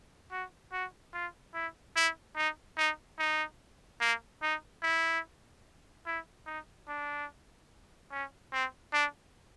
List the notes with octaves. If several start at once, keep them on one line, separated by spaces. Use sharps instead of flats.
F#4
F#4
F4
E4
E4
D#4
D#4
D#4
A#3
D#4
E4
E4
D#4
D4
C#4
C4
D4